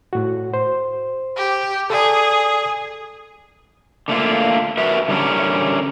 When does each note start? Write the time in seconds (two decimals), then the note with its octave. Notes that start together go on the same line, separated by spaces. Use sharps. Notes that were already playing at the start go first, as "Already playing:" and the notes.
0.13 A2 F#4
0.54 C5
1.37 G4
1.90 G#4 A4 D5
4.08 D3 A3 A#3 F4
4.78 F#4 A#4 B4 E5
5.08 D3 G3 A#3 C#4 A#4